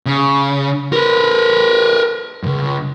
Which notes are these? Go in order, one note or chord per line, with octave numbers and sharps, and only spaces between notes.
C#3
A#4 B4
C#2 F#2